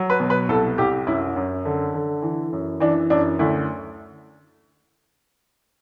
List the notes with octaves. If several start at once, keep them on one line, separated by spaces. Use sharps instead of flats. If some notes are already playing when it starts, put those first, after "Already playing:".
Already playing: F#3
B4
B2
B4
C2 A4
C2 G4
F#2 E4
F#2
D3
D3
E3
F#2
E3 D4
F#2 D4
D2 E4